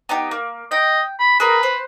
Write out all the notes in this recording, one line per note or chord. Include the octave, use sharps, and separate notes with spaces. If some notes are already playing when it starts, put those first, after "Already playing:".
B3 D#4 G4
A#3
D#5 G5
B5
G#4 A#4 B4 F6
C5